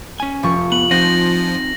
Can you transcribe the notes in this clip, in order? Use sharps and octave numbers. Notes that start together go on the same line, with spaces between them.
C#4 G#5
F1 F3 C#6
B3 F#7
F3 C4 D#4 F#5 A#6